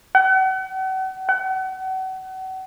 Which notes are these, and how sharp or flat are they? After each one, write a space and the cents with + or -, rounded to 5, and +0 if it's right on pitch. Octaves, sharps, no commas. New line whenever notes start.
F#5 +40
F#5 +35